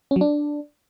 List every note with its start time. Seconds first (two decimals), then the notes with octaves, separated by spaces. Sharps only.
0.11 C#4
0.16 F#3
0.21 D4